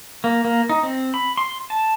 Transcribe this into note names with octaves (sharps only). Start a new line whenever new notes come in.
A#3
A#3
D#4
C4
B5
C6
A5